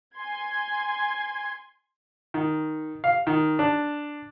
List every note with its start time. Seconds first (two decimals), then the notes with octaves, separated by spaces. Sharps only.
0.15 G#5 C6 G#6
2.34 D#3
3.04 F5
3.27 D#3
3.59 D4